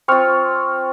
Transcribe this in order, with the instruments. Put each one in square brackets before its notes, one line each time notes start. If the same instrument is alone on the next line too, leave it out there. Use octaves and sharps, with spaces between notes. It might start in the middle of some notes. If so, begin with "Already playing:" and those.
[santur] C4 F4 [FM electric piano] G5 C#6 F6